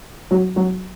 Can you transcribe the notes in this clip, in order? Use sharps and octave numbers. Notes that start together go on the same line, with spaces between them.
F#3 F#4
F#3 F#4